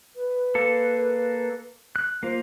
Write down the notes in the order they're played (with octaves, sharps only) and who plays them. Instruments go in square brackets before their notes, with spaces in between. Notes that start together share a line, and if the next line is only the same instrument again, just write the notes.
[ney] B4
[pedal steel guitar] A#3 A4
F#6
[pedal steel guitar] A#3 F4 [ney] C5